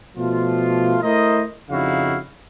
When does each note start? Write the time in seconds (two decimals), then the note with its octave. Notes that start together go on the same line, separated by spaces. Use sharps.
0.17 B2 F3 A3 F4
1.03 A3 E4 A#4 C5 D#5
1.71 F2 C#3 D#4 E4 F#4 F5